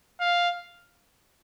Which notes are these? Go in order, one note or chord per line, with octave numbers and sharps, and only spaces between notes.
F5